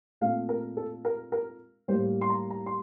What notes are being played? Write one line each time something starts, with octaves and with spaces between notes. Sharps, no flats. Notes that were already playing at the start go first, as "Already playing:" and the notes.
A#2 A3 C4 F5
A#4
A4
A#4
A#4
A2 G3 A#3 C5
C6
A#5
A#5
C6